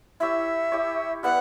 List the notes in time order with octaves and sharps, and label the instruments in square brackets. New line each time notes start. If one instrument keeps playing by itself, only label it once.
[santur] E4 G4 C#5 [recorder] E5
[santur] E4 G4 C#5
[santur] G3 B3 E4 B4 [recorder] F#5